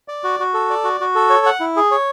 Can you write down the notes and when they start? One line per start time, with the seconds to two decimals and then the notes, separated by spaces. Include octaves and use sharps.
0.08 D5
0.24 F#4
0.40 F#4
0.54 A4
0.70 D5
0.84 F#4
1.01 F#4
1.15 A4
1.30 C#5
1.46 F#5
1.60 E4
1.76 G#4
1.91 C#5